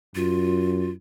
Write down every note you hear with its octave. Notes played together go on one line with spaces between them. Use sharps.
F#2 F4